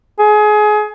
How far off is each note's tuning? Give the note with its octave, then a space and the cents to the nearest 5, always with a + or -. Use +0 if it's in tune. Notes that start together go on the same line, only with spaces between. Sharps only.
G#4 +25